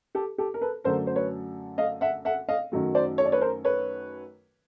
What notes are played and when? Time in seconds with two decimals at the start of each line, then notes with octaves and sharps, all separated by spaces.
0.15 G4 A4
0.38 G4 A4
0.54 A#4
0.61 A4 B4
0.84 F#2 D3 F#3 A3 A#4 C5
1.07 C5
1.16 B4 C#5
1.78 D#5 F5
2.01 E5 F#5
2.25 E5 F#5
2.48 D#5 F5
2.72 F#2 D#3 F#3 A3
2.95 C5 D5
3.18 C#5
3.25 D5
3.32 B4 C#5
3.41 A#4 C5
3.65 B4 C#5